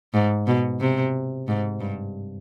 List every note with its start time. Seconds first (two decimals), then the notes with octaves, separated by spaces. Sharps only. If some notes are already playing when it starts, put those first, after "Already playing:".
0.14 G#2
0.47 B2
0.81 C3
1.48 G#2
1.80 G2